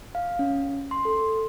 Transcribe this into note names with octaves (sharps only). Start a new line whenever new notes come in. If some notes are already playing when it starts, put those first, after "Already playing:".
F5
C#4
C6
A4